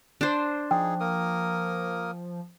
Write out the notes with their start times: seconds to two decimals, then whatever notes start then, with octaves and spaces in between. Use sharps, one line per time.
0.21 D4 C5
0.71 F3 D#4 G#4 G5
1.00 A#3 A#4 D#6